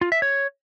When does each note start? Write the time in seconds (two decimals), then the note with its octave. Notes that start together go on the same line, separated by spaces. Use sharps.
0.01 F4
0.12 E5
0.22 C#5